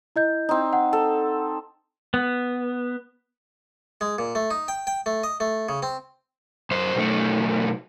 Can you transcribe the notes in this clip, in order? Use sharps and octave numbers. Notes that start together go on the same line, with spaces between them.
E4 D#5 G6
C4 D#4
F#5
A4
B3
G#3
A#2
A3
D#4
G5
G5
A3
D#5
A3
C#3
C4
F#2 C5
B1 A3